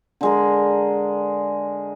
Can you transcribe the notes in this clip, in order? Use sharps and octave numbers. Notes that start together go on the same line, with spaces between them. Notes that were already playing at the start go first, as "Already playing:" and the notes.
D3 G#3 A#4